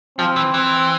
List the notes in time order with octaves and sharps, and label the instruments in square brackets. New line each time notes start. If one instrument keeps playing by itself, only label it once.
[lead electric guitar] F3 [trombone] C4
[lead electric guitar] E3
[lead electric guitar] E3 [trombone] C4